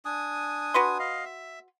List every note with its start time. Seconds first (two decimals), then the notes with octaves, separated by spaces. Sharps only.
0.05 D4 G#5 D#6
0.74 F#4 B4 C6
0.99 D#5 F5
1.25 E5